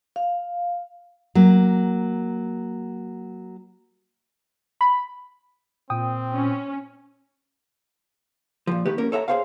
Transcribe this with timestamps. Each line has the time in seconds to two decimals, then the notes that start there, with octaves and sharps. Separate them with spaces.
0.16 F5
1.35 F#3 A#3
4.81 B5
5.90 A#2 C4 G5 D#6
6.32 C#4
8.67 A#2 F3
8.86 D#3 A3 G4 B4
8.98 A#3 C#4 A#4
9.12 A4 C#5 E5 F5 A#5
9.28 G#4 A4 C5 C#5 F5